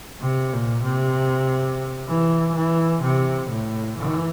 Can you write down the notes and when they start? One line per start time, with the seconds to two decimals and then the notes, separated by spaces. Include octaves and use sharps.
0.21 C3
0.53 A#2
0.84 C3
2.08 E3
2.55 E3
3.03 C3
3.50 A2
3.97 E3